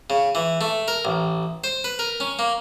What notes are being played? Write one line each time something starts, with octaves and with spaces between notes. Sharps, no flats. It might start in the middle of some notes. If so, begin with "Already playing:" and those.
C#3
E3
A3
A#4
A1
C5
B4
A#4
C#4
A#3